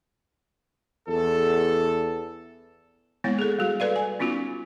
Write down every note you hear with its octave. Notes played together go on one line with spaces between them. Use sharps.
E2 A4
G#3 A#3 B3 E4 C#5
G#4 A4
G3 F#4 G#4
A4 B4 D5 F5
G#5
B3 C#4 D#4 F4 F#4